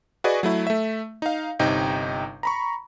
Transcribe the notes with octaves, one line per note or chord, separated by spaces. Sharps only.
F#4 G#4 B4 D5 D#5 G#5
F#3 A3 E4
A3 E5
D#4 F5
G1 C3 D#4 G5
A#5 B5 C#6